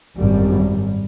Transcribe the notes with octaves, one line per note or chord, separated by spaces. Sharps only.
G#1 F#2 G3